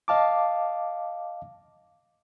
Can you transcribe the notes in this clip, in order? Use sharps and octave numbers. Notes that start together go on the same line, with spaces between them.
D#5 F5 A5 D6